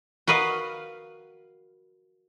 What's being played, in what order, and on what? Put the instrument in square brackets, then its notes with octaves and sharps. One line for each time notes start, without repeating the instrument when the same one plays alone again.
[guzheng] F#4 A#4 B4 D#5 F5